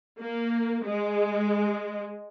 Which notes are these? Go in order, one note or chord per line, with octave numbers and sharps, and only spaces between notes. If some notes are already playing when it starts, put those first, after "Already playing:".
A#3
G#3